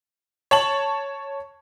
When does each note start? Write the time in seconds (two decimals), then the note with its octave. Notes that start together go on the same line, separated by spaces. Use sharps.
0.51 C#5 A5 F#7